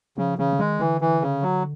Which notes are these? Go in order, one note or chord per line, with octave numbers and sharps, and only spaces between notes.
C#3 F3
C#3 E3
D3
D#3 G#3
D3 E3
E3
C#3
F#3